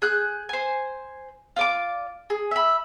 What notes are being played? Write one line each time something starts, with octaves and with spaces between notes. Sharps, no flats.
G#4 F#6 G6
C5 G#5
F4 D5 D6
G#4
E5 B5